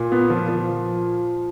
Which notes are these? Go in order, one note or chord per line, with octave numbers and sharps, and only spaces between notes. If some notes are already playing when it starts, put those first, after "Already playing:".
Already playing: A#2
B3
F3
F3